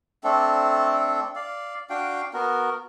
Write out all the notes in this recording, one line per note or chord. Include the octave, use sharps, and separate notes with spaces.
A3 C4 D4 A4
D5 F5
D4 F#4 F5 G5
B3 F#4 A#4